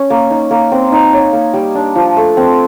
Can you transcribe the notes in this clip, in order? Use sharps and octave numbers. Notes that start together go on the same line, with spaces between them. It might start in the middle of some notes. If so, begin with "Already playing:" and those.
Already playing: C#4
A#3
D#4
A#3
C4
D#4
C#5
A#3
G3
D4
F3
A3
C4